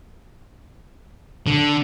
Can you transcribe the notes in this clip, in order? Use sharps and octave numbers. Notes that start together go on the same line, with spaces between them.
D3